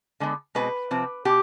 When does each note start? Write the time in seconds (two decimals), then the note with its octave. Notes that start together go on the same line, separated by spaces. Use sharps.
0.20 D3 G#3 B3
0.55 B2 G#3 C4 B4
0.91 C3 F3 C4
1.25 B2 G4